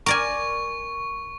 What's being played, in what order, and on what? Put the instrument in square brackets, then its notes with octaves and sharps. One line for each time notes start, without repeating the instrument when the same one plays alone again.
[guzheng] A#4 D5 G#5 [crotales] C#6